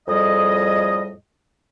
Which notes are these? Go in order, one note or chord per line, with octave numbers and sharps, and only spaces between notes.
F2 A2 G3 G#4 D#5